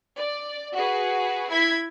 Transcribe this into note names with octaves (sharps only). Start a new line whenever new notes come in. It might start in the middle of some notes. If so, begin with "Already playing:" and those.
D5
F#4 G#4 B4
E4 G#6 B6